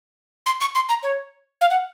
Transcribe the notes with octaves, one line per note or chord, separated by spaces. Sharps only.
C6
C#6
C6
A#5
C#5
F5
F#5